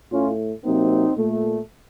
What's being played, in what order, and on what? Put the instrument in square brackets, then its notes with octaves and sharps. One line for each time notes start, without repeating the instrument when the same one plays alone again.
[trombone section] A2 A3 C#4 F4
C3 F#3 A#3 C4 D#4
A#2 A3